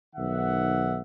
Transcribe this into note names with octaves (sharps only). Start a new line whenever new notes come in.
B1 D#3 E5 F#5